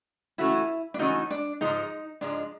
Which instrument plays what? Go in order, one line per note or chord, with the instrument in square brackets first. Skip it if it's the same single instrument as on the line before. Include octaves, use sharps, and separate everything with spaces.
[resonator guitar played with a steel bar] E3 A3 C#4 F#4 [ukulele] E4
[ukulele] D4
[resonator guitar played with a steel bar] E3 A3 C#4 F#4 [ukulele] D#4
[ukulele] D4
[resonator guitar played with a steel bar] G#2 F3 G#3 [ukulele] D#4
[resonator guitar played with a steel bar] G#2 F3 G#3 [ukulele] D4